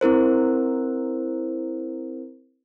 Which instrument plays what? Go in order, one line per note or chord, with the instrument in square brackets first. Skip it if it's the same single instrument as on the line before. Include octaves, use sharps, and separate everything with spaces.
[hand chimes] C4 E4 A#4 C5